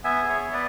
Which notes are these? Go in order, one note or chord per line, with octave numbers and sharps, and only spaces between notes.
B3 E5 G#5
G#4
C#5 E5
B3
B4 D5